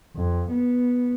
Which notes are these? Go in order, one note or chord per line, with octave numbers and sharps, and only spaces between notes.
F2
B3